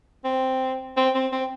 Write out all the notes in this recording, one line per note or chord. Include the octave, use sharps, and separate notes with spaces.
C4
C4
C4
C4